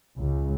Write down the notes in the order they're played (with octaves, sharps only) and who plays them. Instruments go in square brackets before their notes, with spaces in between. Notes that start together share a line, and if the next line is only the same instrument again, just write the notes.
[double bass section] C#2